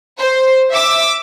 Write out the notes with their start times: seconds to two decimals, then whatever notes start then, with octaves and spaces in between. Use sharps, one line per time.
0.18 C5
0.72 E5 D6 E6